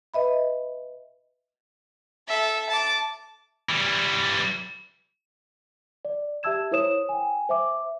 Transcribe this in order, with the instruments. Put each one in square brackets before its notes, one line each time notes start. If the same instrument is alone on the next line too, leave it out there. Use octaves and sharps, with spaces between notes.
[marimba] B4 D#5 E5 B5
[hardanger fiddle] A4 E5
A5 D6
[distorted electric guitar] E3 G3
[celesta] D5
G4 E5 A5 E6 G#6 E7
E4 A#4 C5 C#5 D#6 E7
G5 G#5
C5 E5 D6